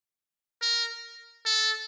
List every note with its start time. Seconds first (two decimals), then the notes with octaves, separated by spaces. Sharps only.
0.62 A#4
1.46 A4